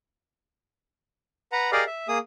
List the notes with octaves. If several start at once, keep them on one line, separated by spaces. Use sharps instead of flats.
B4 F#5 A#5
G4 G#4 A#4 D5 D#5 F5
E5
A#3 G#4 D#6